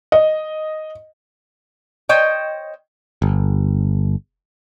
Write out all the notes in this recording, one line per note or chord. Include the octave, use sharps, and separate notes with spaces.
D#5
C5 C#5 D#5 G5
G1